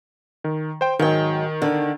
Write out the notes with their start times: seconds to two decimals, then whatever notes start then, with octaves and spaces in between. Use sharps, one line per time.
0.44 D#3
0.81 C5 G5
0.99 G#2 D#3 F#3 G5
1.62 D3